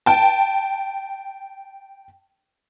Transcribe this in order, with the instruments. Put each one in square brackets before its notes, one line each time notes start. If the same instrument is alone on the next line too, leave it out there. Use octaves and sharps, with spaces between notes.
[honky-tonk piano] G5 A5